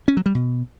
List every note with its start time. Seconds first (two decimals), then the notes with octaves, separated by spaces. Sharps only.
0.08 C#4
0.17 F#3
0.26 G3
0.35 B2